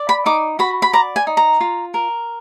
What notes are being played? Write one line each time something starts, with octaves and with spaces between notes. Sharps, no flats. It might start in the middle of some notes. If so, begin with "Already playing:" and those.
Already playing: D5
B5
D#4 D6
F#4 B5
B5
D5 A#5
G#5
D#4
A#5
F4
A#4